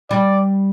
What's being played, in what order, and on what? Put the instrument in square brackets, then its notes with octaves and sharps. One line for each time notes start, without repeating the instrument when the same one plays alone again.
[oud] G3 [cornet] D5